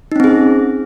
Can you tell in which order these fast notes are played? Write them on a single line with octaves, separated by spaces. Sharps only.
D#4 C#4 C4 G#4